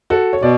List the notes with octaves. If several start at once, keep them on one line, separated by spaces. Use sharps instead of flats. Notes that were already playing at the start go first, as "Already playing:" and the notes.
F#4 A4
C#5
B2 D5